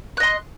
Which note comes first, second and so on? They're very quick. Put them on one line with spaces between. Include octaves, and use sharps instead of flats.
F#6 D#5 C6